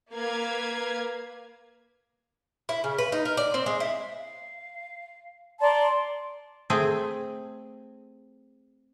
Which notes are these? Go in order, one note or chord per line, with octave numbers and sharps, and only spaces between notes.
A#3 B4 F5 G#6
E4
C#3
B4
D#4
A#4
D5
C4
G#3
E4
F5
D5 A5 A#5 C6
A3 C4 G#4